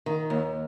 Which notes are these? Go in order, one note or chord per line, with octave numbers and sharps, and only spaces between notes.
D#3
D#2